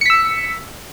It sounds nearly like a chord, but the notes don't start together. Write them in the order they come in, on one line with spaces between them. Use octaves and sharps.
C#7 B6 E6